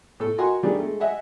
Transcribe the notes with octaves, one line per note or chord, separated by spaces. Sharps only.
A2 A4
F#4 A#4 D#5 F#5 G#5 C6
D#3 G3 A3 D4 G4 G#4
G#3 A3
D#5 E5 F#5 G#5